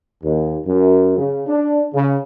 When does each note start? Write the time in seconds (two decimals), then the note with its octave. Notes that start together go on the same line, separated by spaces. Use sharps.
0.23 D#2
0.66 F#2
1.17 C#3
1.47 D4
1.93 C#3